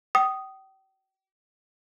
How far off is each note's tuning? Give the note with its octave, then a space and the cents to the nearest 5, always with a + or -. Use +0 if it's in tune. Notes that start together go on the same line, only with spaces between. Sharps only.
G5 -35 D#6 +0